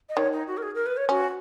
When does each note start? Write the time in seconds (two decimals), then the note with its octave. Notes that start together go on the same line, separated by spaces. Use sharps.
0.09 D#5
0.17 D#3 C#5
0.32 D#4
0.47 F#4
0.57 A#4
0.62 G#4
0.75 A#4
0.86 B4
0.97 C#5
1.09 C#4 F#4